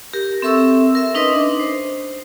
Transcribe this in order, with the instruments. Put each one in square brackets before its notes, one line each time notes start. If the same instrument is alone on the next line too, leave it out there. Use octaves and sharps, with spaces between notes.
[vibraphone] G4 A#4
C4 A4 E5 C#6 E6
A#4 E5
C#4 D#4 B4 D#5 C6 D#6
D4
C5